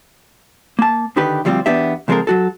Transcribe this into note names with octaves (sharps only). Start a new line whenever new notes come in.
A#3 A5
D3 D#3 G4 B4
D2 F3 G3 C4 F4
E2 B3 D4 G4 E5
C#2 F3 G#3 C4 A4 A#4
F#3 F#4 A4